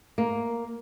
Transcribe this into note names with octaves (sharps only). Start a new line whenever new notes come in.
A#3